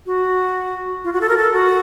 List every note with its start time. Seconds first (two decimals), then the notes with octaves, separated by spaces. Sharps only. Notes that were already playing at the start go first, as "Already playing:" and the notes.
0.06 F#4
1.04 F4
1.13 F#4
1.21 A4
1.29 A#4
1.38 A4
1.53 F#4